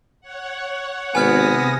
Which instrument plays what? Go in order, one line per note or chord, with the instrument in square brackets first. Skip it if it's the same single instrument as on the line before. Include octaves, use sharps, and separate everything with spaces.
[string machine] C#5 F#5
[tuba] G#1 [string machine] C3 D#6 A#6 [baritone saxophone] B3 [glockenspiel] G#5 F6 G#6